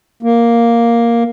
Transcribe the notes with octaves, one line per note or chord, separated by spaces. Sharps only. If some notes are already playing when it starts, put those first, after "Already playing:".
A#3